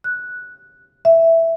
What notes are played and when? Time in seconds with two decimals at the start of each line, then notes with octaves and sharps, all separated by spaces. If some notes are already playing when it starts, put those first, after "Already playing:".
0.04 F#6
1.05 E5